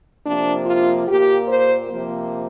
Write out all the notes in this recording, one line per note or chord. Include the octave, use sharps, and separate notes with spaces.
C3 F3 A#3 D4
F4
A#2 A#3 G4
C5
C3 F3 A#3